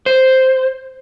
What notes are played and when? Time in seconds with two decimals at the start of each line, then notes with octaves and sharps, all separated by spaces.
0.06 C5